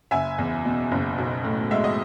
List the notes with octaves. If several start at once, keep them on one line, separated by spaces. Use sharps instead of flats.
F#1 E5 G#5
E2
B2
F#1
B1
A2
G#3 E5
D#5